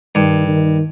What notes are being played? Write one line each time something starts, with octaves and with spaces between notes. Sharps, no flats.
G2 D#3
D#3